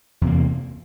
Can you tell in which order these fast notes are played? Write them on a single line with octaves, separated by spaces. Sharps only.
E2 C3 A#3